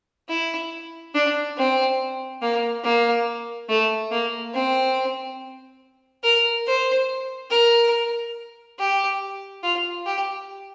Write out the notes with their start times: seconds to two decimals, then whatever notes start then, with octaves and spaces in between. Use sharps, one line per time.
0.29 E4
1.14 D4
1.57 C4
2.42 A#3
2.84 A#3
3.69 A3
4.11 A#3
4.54 C4
6.23 A#4
6.67 C5
7.51 A#4
8.79 G4
9.63 F4
10.06 G4